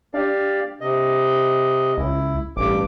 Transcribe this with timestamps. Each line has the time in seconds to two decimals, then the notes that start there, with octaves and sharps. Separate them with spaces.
0.14 D4 G4 D5 F5
0.81 C3 D#5
1.98 C#2 E4
2.57 A1 G2 D6